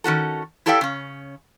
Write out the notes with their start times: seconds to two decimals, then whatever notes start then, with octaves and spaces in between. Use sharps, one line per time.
0.04 D#3 C#4 F#4 A4
0.66 E4 G4 A4 D5 F5 G5
0.81 C#3 C#4